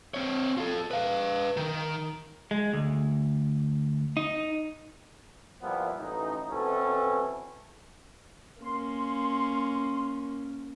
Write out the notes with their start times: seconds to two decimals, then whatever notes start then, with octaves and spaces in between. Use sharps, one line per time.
0.14 C4 C#5
0.58 F4 A4
0.91 B4 F5
1.57 D#3
2.51 G#3
2.73 D2
4.17 D#4
5.62 A#2 F3 G3 B3 E4 F4
5.98 A1 D#4
6.51 B2 E3 C4 C#4 A4
8.62 A#3 C#4 C6